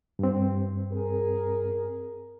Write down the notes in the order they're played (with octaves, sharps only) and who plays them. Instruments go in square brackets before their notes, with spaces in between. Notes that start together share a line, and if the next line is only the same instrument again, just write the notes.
[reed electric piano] G2 C4
[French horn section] G#4 A#4